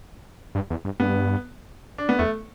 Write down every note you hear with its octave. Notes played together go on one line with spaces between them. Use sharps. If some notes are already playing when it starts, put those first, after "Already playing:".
G2
E2
G2
G2 B3
D4
B3
E2 A3